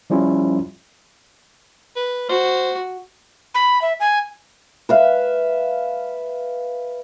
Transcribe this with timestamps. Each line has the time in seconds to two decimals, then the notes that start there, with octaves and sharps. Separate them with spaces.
0.10 F3 G3 C#4 E4 F4
1.96 B4
2.29 F#4 C5
3.55 B5
3.82 E5
4.00 G#5
4.89 B4 E5 F5